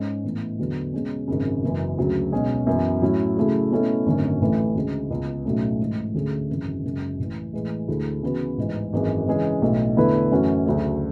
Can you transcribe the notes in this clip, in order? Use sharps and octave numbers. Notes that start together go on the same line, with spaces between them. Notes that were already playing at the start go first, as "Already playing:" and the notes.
Already playing: G#2 G#3 C#4
A2 E3 B3
E2 D3 F#3
B2 G#3 C#4
G#1 F#2 C#3
F#1 F#2 E3
D2 C#3 F#3
B1 B2 G#3 C#4 G#4
F#2 E3 B3
A2 F#3 C#4 E4
C#3 F#3 A3 E4 G#4
B2 A3 C#4 E4 A4
G#1 F#2 D3 A3 C#4
A1 A2 E3 A3
D2 C#3 G#3
C#2 C#3 G#3 B3
B1 A2 F#3 A3 C#4
G#2 E3 A3
D2 D3 A3 C#4 G#4
G#1 F#2 C#3 E3
F#1 F#2 C#3 G#3
A1 A2 E3
A2 E3 G#3
D2 D3 A3 E4 G#4
C#3 E3 B3 F#4 B4
A1 G#2 E3
G#1 F#2 E3 G#3
C#3 E3 G#3 C#4 G#4
B1 A2 E3 A3
E2 D3 A3 E4 B4
F#2 E3 A3 C#4 F#4
D2 C#3 F#3 A3 D4